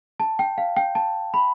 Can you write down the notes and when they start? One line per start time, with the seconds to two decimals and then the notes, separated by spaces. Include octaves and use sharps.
0.20 A5
0.39 G5
0.58 F5
0.77 G5
0.95 A5
1.34 B5